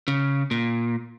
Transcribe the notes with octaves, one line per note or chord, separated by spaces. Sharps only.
C#3
A#2